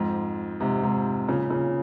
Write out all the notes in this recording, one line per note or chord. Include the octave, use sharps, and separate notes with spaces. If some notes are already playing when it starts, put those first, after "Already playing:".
Already playing: F2 G#2
G#2 C3
G#2 C3
A#2 C#3
A#2 C#3